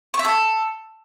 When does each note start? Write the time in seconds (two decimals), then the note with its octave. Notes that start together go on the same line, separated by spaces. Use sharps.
0.14 C#6
0.19 E5
0.25 A4